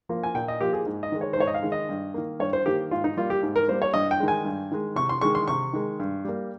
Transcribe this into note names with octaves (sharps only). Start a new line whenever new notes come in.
F3 A#3
G#5
A#2 G5
D#5
F3 A#3 G4
G#4
G#2
D#5
D#3 G#3
C#5
C5
G#2 C#5
D#5
F5
D#3 G#3
D#5
G2
D#3 A#3
G2 C#5
C5
D#3 A#3 G4
G#2 F4
D#4
G3 A#3 F4
G4
G#2
A#4
G3 A#3 C5
C#5
G2 D#5
G5
D#3 G#3
G#5
G2
D#3 G#3
C3 C#6
C6
D#3 G#3 C#6
C6
C3 C#6
D#3 G#3
G2
G3 A#3